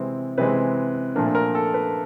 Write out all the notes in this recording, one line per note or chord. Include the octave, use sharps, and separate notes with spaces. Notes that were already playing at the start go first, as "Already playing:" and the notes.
Already playing: C3 E3 G#3 C4
C3 E3 G#3 C4 B4
A#2 F3 A3 D4 A#4
A4
A#4
A4
B4